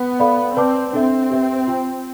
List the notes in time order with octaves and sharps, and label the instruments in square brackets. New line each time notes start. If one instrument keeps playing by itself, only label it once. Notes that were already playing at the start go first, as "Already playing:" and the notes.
Already playing: [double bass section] B3
[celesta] A4 D5 F5 B5
[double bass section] C4 [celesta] B4 D5 A5 D6
[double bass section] C4 [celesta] D4 A4 E5
[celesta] G4 B4 E5 G5
F4 C5 G5